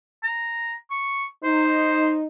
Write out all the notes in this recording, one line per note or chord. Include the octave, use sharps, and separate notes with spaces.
A#5
C#6
D#4 C5